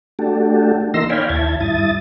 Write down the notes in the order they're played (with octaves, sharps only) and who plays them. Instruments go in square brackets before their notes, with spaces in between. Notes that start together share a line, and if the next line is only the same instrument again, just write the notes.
[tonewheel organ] A3 D4 F#4 G4 A4
E3 A#3 D#4 C6 E6 A#6
C#5 D5 F5 G5 G#5 B5
D#2 E4 A5 G#6
G2 E4 D#6 A6